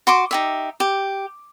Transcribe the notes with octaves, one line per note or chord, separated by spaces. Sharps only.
F#4 C6 D6
D#4 G4 E5
G4